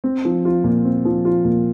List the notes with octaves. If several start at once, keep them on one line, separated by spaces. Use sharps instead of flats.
C4
F3
F4
A#2
C4
F3
F4
A#2